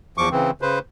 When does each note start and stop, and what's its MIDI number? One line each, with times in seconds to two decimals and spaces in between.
0.18 0.29 40
0.18 0.29 53
0.18 0.29 85
0.18 0.29 86
0.31 0.51 49
0.31 0.51 52
0.31 0.51 60
0.62 0.79 49
0.62 0.79 71
0.62 0.79 72